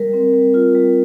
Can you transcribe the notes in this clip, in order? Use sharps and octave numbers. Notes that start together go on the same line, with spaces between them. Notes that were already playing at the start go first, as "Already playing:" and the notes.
Already playing: G3 A#4
C4
G3
F4
G3